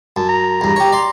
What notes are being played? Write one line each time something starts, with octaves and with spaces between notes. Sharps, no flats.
F#2 A5
A#5
E2 G2
G4 C#5
D5 C6